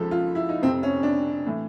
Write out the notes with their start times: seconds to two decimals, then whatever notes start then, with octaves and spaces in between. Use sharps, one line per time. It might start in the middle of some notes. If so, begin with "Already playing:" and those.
Already playing: C#2 C#3 F3 A4
0.11 F4
0.35 E4
0.49 D#4
0.62 F1 F2 C3 C4
0.83 C#4
1.03 D4
1.46 A2 E3